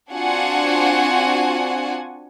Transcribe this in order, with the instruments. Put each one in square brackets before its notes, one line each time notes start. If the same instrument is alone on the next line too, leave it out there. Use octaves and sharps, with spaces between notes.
[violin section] C4 D4 F4 F#4 F#5 G#5